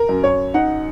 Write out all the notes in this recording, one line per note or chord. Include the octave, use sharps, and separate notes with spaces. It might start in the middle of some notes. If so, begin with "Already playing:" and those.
Already playing: A#4
F#2
C#5
D#4 F#5